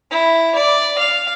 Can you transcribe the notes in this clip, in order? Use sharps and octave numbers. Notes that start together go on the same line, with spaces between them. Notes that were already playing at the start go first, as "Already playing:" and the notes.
E4
D5
F5